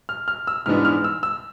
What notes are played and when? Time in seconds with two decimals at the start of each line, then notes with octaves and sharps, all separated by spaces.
0.09 F6
0.28 F6
0.47 E6
0.66 G#2 E3 G#3 B3 D4 F6
0.85 F6
1.04 E6
1.23 E6